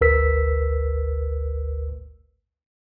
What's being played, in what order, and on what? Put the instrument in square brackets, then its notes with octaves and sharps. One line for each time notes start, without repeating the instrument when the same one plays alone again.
[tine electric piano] G#1 D2 A#4 B4 E6 B6